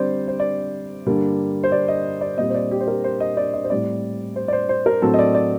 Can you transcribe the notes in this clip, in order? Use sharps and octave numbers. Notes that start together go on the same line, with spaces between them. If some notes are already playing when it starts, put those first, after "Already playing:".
Already playing: D3 G3 C4 C5 D5
C5
D5
G2 D3 G3 A#3
C5
D5
D#5
D5
A#2 G3 C4 D#5
C5
D5
G4
C5
A#4
C5
D#5
D5
D#5
C5
A2 G3 C4 D5
C5
D5
C5
C5
A#4
A2 F#3 C4 A4
D#5
D5
D5